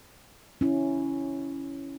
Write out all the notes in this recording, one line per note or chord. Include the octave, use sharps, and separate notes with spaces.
C#4 E4